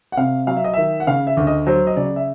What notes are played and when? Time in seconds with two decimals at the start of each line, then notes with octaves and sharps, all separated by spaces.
0.12 F#5
0.17 C3 F5
0.47 F#3 F5
0.56 E5
0.64 D#5
0.74 D#3 E5
1.00 F#5
1.07 C#3 F5
1.27 E5
1.37 D2
1.47 D#5
1.67 F#3 C5
1.87 D#5
1.96 C#3 D5
2.16 E5